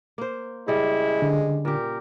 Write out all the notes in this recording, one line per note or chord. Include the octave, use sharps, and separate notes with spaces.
A#3 C5
C#3 G3 G#3 E4
D3
A#2 G4 A#4